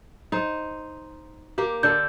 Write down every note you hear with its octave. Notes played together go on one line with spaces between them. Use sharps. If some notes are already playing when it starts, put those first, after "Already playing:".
D#4 C5
A#3 G4
D3 D4 A4 G6